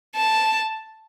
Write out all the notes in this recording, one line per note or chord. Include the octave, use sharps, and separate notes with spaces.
A5